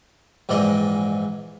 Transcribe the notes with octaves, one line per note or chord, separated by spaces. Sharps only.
A#1 G#2 E3 D5 D#5 G5